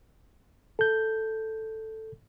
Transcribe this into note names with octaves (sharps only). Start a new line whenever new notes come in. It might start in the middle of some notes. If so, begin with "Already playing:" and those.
A4 G6